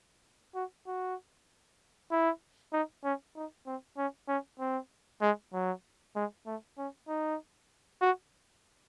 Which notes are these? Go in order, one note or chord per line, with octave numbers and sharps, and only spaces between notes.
F#4
F#4
E4
D#4
C#4
D#4
C4
C#4
C#4
C4
G#3
F#3
G#3
A3
C#4
D#4
F#4